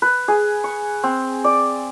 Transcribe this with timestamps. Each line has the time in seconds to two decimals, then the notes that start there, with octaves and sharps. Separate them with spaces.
0.02 B4
0.28 G#4
0.64 C#6
1.03 C4
1.44 D5